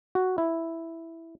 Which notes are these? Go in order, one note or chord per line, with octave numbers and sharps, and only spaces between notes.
F#4
E4